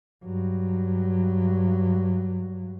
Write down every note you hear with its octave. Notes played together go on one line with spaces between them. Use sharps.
G2 F#3